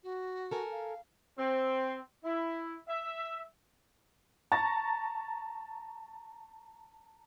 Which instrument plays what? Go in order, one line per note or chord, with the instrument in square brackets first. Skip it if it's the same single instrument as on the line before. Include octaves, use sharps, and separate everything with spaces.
[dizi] F#4
[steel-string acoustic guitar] A4 A#4 G#5
[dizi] F5
[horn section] C4
E4
E5
[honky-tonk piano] A5 A#5 C#6 A6 A#6